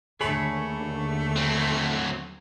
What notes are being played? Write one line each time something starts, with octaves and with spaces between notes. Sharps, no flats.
D#2 D3 A3 G#4 C#5 B5
F#3 C4